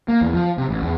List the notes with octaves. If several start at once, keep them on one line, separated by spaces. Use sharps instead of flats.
A#3
E2
F3
C3
A1
E2